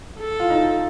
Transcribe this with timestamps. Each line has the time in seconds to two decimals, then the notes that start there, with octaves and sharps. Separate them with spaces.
0.19 A4
0.40 F4
0.50 D#4